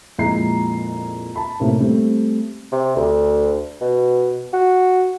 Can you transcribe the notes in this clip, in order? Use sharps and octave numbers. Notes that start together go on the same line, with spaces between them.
F2 A#2 G#3 E4 A#5 C7
A5 B5
A2 C3 A#3
G3 A3 C4
C3
D2
B2
F#4